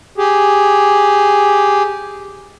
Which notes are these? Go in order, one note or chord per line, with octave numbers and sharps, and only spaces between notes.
G4 G#4